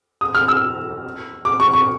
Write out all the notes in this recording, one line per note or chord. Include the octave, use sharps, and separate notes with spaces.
D#6
F6
E6
D6
C#6
C#6